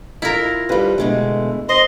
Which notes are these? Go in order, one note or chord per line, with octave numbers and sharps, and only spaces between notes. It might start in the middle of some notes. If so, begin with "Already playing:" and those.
E4 F4 A#4
F3 G3 F4 B4 F5
B2 D3 G#3 A3
C5 D#5 C6